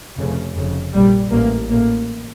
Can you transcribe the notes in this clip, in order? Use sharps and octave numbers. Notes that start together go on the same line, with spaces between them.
F1 F2 C#3
F1 F2 C#3
A#1 A#2 G3
A1 A2 A#3
A1 A2 A#3